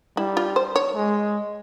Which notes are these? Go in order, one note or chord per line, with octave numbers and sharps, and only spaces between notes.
G3 E4
F4
C5
C#5
G#3